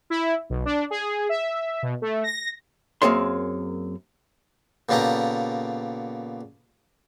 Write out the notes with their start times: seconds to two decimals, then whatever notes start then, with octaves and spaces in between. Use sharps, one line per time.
0.10 E4
0.50 B1
0.65 D4
0.90 G#4
1.29 E5
1.83 B2
2.02 A3
2.24 A#6
3.02 F#2 A#3 C4 G#4 C#5 C6
4.89 A#2 C#3 B3 G4 A4 A#5